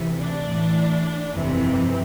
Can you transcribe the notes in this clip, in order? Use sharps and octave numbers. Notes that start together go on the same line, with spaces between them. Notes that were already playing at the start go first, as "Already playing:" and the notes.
Already playing: D2 C3 E3
D4
A1 A2 E3
G1 F2 C3 E3 C4